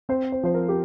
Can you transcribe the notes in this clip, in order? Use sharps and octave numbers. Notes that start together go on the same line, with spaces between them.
C4 C5
C5
F3 C5
A#4
G4